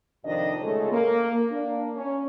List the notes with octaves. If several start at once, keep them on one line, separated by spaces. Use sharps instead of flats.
F2 C3 D#3 F3 D4 D#5
A#2 C#3 G#3 A3 A4 C#5
A#3
A#3 D4
C#4